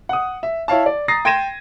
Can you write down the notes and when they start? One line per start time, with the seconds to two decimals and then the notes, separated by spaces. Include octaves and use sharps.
0.09 F#5 D#6
0.43 E5
0.68 E4 C#5 F5 A5
0.86 D5
1.08 A#5 D#6 A6 A#6 C7
1.25 G5 C6 G#6 A#6 D#7 E7